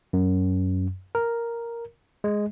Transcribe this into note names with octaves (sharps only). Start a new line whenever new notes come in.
F#2
A#4
G#3